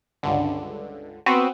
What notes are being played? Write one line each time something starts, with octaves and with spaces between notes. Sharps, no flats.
C#2 G2 D3
B3 C4 F#4 B4